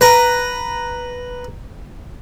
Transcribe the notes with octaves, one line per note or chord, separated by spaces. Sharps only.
B4 A#5